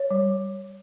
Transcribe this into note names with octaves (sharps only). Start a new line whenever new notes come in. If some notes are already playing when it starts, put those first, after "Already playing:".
Already playing: C#5
G3